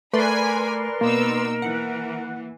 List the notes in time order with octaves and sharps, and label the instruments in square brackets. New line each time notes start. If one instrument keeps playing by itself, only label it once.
[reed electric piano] A3 [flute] A#4 [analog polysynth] B4 D5 C6 [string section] G#5 B5
[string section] B2 D#4 E6 [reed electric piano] A#3
[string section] E3 [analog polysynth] F#5